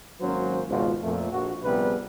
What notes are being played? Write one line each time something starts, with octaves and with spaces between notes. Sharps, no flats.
G#1 F#3 A#3 C#4 C5
G#1 C#2 B2 F4 F#4 C5
F2 A#2 A3
A#1 F#4
A#1 C3 G3 B3 G#4 B4